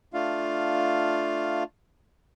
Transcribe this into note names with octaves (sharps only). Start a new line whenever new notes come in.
A3 D4 F4 F5